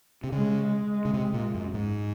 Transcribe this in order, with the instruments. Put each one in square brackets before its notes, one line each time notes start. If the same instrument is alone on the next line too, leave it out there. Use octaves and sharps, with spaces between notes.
[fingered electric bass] C3
[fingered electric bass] C#3 [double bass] G#3
[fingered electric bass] C#3
C3
A#2
F#2
G#2